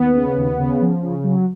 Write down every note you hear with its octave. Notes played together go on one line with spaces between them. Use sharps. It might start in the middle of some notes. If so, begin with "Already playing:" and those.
Already playing: D#2 B3
C#3
D#2
C#3
F3
C#3
F#3